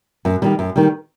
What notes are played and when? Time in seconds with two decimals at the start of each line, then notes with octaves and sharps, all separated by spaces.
0.25 F#2
0.42 D#3 G3
0.59 F#2
0.76 D#3 G3